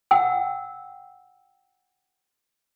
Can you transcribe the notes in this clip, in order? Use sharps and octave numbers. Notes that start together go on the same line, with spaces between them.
F#5 G5 E6